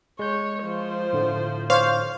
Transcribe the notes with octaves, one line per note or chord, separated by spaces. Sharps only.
G#3 C#5 G6
F3 C5
A2 D3 A3
C5 C#5 F5